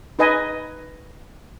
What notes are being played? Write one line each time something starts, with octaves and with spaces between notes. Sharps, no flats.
D#4 B4 D#5 G#5